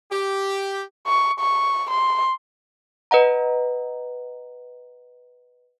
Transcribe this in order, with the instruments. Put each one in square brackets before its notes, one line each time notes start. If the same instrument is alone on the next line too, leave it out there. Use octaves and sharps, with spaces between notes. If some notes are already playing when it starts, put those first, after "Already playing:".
[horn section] G4
[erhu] C#6
C#6
C6
[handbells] B4 D#5 F#5 A#5